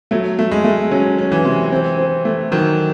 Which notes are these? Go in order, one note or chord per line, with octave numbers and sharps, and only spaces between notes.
F#3 A3
A3
G#3
A3
F#3 C#4
C#4
E3
C3
C4
C4
A3
D#3 F#3